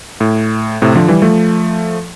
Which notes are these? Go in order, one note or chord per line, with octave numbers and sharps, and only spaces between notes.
A2
A2 C3
D3 F3
E3 G3
F3 A3